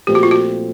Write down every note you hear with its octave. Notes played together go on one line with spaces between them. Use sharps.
A#2 F3 A3 C4 G4
F#4
F4
F#4